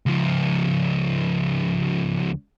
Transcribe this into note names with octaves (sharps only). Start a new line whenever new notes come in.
C#2 F3